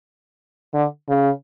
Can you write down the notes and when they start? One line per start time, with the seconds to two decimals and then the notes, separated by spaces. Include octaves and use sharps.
0.74 D3
1.09 C#3